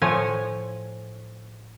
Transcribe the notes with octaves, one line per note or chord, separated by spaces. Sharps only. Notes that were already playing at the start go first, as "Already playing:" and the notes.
A2 F3 C#5 G#5